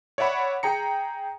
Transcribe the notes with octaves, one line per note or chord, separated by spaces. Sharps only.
C#5 D5 E5 F#5 B5
G#4 G5 A#5 C#7